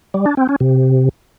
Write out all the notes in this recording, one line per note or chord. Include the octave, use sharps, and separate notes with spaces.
G3
D4
C4
C#4
C3